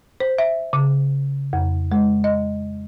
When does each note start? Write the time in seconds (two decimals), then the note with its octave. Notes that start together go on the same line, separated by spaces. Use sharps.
0.20 C5
0.38 E5
0.73 C#3
1.53 F2
1.92 G#3
2.24 D#5